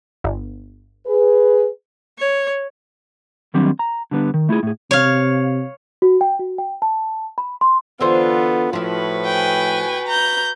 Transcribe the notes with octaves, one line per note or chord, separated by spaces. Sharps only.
G1
G#4 B4
C#5
D#3 F#3 G3 C4 D4
A#5
D3 G3 B3 D4
D#3
A3 E4 F4 G#4
A2 G#4
C3 C#5 F5
F#4
G5
F#4
G5
A5
B5
C6
D3 E3 B3 F4 C5
A2 F3 E4 F#4 B4
G5 G#5
A#5 G6